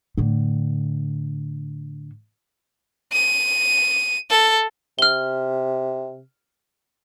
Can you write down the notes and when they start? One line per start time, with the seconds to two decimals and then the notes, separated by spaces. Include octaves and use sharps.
0.18 A2 D3
3.13 D#7
4.30 A4
4.99 C3 F6 G7